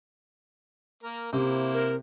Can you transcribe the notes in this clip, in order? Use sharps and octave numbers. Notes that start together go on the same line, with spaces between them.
A#3 A#4
C3 A#3 E4 C5
A#4